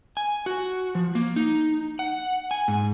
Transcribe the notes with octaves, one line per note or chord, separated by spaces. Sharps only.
G#5
F#4
F3
A#3
D#4
F#5
G#5
G#2